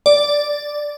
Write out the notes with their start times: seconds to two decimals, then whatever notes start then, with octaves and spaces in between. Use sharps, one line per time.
0.06 D5